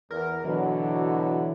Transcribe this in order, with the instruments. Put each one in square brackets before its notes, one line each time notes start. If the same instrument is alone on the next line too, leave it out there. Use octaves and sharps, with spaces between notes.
[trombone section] E2 [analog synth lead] A#4
[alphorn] B2 [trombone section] D3 F#3 [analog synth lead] E3